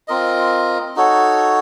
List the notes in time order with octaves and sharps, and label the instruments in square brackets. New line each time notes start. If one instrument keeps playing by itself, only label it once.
[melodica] C4 F4 A#4 D#5
D#4 F#4 A4 C#5